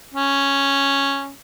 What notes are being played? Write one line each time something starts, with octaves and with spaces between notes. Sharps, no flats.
C#4